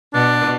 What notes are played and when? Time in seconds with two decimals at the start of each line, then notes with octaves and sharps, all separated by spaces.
0.14 B2 D4